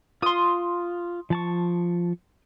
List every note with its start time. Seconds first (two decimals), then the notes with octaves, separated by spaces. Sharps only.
0.22 F4 C6 D#6
1.30 F3 A5 C#6